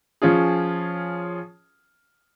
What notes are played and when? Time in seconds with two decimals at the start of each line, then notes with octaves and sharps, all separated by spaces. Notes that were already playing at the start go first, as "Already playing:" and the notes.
0.22 F3 C#4 F4 G#4